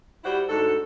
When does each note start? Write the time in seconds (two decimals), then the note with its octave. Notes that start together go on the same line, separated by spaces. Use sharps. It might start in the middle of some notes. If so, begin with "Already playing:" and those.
0.24 G3 E4 F#4 G4 C5 F#5
0.49 D2 G#2 F#4 A4